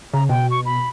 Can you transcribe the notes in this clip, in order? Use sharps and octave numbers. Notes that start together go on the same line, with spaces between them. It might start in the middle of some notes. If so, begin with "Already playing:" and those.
C#3 A#5
B2 G5
C#6
B5